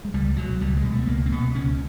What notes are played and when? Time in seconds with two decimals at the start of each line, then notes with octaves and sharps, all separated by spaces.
0.05 G#3
0.14 C#2 G3
0.37 B2 F#3
0.61 C#2 G3
0.77 G#3
0.84 B2
0.92 A3
1.07 C#2 A#3
1.26 C4
1.31 B2 B3
1.55 C#2 C#4